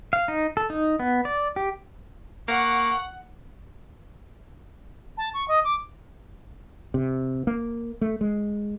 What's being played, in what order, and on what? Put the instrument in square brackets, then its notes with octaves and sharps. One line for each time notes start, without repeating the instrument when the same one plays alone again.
[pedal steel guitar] F5
D#4
A4
D#4
B3
D5
G4
[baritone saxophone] A#3 [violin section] F#5 [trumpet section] C#6
[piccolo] A5
C#6
D#5
D6
[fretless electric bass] C3
A#3
A3
G#3